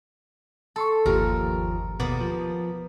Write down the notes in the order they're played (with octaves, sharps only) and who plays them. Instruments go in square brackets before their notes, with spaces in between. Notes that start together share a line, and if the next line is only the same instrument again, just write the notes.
[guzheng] A4 [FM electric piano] A5 C6 C#6
[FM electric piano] G1 G4 [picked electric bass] D#2 A#2 F3 [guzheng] A#4
[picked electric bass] D#2 B2 [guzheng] A#3 B3 D5
[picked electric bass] F3